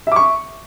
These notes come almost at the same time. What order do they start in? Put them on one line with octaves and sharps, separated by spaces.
E5 D6 C#6